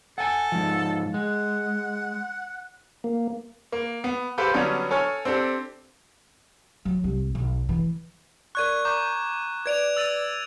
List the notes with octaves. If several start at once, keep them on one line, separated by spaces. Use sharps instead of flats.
A4 F#5 G#5
G#2 F3
G#3 F#5
A#3
A#3
B3
G4 A4 B4 C5 F5 A5
D3 F#3 G3 B3 C#4 D4
A4 C#5 G#5 F6
C4 D4 G4 A4
F#3
C2
B1
E3
A#4 D5 C#6 F#6 G#6 D#7
A#5 C#6 D6 G6
B4 D5 G#6 D7 F7
E6 A6 D#7